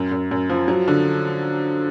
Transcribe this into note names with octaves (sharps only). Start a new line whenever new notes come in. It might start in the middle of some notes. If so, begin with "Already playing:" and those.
Already playing: F#2
F#2
F#2
F3
F#3
D3